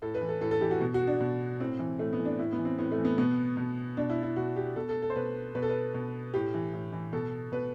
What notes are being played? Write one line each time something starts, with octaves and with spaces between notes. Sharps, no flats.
A2 A4
B4
E3
A4
A2 A4
A4
E3 G4
F#4
B2
F#4
D4
B2
A2 C4
E3
A2 A3
B3
E3
D4
A2 E4
B3
E3
C4
A2 B3
A3
E3
B3
B2 B3
B2
B2 D4
E4
E4
B2 F#4
G4
B2 A4
A4
A4
C5
B2 B4
B2 B4
A4
B4
B2
A2 G4
E3
A2
E3
B2 A4
B2 B4